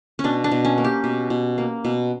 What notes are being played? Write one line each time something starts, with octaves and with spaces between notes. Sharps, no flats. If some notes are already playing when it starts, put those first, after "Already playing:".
C#4
B2 D4
D4
B2
C#4
A#3
G4
B2
B2
A#3
B2